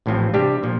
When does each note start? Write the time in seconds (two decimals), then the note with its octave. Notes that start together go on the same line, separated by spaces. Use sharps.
0.06 A1 A2 F3 C4
0.34 C3 G3 D4 G4
0.63 A#2 F3